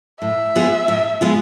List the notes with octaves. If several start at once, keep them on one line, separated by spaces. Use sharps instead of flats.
A2 E5
G#3 B3 F4 G#4
A2
G#3 B3 F4 G#4